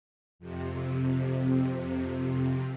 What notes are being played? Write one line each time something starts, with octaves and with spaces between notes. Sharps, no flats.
F2 C3